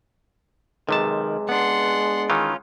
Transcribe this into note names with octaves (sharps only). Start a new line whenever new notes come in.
B1 C3 D#3 G#3 A5
B3 D4 F#5 C6
D#3 E3 C#4 F4